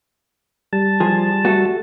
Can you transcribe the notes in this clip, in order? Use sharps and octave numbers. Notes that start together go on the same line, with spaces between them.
G3 A5
F3 G#4
A3 F#4 A4